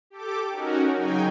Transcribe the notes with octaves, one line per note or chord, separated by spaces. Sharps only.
G4 A4 D6
C#4 D#4 F#4 A#4
C#3 F#3 D#4 G5 G#5